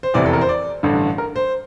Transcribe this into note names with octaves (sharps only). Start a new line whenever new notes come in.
C5
F1 E2 C3 E3 D5
A4
A#4
C5
D5
A1 G2 D3
A#4
C5